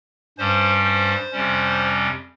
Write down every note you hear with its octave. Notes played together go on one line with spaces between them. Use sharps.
G2 G3 C#4 C5
C5
F2 C3 G3 C#4